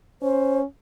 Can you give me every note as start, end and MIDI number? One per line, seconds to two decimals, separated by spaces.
0.22 0.64 61
0.22 0.60 72